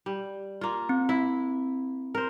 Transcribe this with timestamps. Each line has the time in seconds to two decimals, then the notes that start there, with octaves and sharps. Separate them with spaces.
0.06 G3
0.61 A#3 F4
0.89 C4
1.09 E4
2.15 A#4 C5